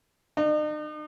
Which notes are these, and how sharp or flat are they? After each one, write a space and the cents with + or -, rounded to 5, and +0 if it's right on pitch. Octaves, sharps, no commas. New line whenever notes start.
D#4 -45